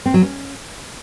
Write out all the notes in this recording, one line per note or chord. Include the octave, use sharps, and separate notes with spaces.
C4
F#3
C#4